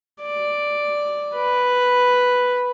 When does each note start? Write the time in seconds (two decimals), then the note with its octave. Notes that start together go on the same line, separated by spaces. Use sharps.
0.21 D5
1.35 B4